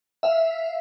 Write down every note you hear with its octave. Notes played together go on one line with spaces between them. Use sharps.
E5 F5